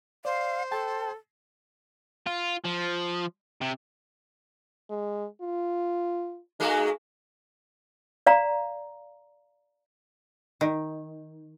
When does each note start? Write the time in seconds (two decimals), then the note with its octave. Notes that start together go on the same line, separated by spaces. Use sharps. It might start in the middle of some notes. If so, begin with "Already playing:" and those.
0.25 C5 D5 F5
0.71 A4 G5 A5
2.27 F4
2.64 F3
3.61 C3
4.90 G#3
5.41 F4
6.60 G#3 A3 D#4 F#4
8.27 D5 F5 A#5
10.61 D#3